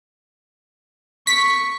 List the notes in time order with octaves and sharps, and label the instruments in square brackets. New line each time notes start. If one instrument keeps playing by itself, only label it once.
[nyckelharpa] C#6 [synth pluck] B6